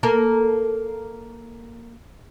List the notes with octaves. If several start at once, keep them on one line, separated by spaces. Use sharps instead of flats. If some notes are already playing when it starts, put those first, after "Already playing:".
A#3 A4 A#4